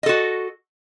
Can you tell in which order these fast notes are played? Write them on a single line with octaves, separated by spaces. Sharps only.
D#5 A4 F#4